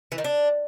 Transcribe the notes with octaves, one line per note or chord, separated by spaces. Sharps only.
E3
D#3
D4